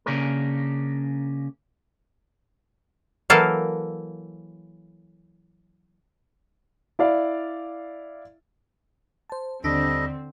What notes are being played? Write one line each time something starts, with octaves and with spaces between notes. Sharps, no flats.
C#3 A#3 C#4 D4 G#4 A#4
E3 F#3 A#3 A4 F5
E4 D5 F5
C5 A5
D#2 D3 G3 C4 D4 A4 D#5 B6